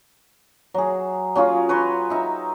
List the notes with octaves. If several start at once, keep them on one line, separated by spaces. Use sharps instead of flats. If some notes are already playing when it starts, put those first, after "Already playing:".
F#3 G#4
F#3 C#4 F4 G#4
B4 C#5 A#5 C6
D#4 E5